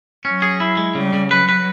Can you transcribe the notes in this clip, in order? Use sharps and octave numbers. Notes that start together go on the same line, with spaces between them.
F#3 C#4
G#4
E4
G#3
C#3 G3
C#3
F#3 B4
B4